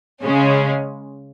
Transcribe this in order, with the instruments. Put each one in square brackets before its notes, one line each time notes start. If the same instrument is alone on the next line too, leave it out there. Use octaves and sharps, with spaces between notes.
[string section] C#3 G#3 C#4